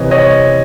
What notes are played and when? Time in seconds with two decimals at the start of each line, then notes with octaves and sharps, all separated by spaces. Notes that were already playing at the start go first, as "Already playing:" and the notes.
Already playing: C2 C3 E3 C#5 D#5
0.11 C#5 D#5